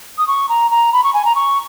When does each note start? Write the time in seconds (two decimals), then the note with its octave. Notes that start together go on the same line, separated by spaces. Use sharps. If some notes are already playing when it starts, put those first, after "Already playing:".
0.18 D#6
0.28 C#6
0.49 A#5
0.71 A#5
0.93 B5
1.04 C#6
1.14 G#5
1.25 A#5
1.35 C#6